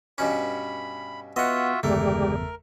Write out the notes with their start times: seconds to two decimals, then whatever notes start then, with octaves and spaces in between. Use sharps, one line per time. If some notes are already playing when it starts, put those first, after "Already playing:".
0.18 G2 B2 C#4 B5
1.36 B3 F4 F#4 D#5 E5 F#5
1.83 G1 E2 C#3 G#3 A3 G4 A#4 D5